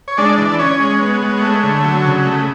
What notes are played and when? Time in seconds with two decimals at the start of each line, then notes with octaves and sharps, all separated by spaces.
0.08 C#5
0.17 G#3 D4 D5
0.38 E3
0.59 C#4 C#5
0.80 G#3
1.01 B3
1.22 G#3
1.42 A3
1.63 D3
1.84 F#3
2.04 C#3
2.25 A3